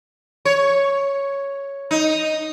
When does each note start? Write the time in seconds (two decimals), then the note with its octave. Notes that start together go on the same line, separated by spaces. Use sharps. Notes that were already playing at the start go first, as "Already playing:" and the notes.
0.45 C#5
1.91 D#4